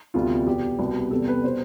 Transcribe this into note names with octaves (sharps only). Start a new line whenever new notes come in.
D2 C3 G3 B3 F4
E2 B2 B3 G4
C2 B2 B3
E2 C3 G3 B3 A4
B4
B2 G3 B3 C5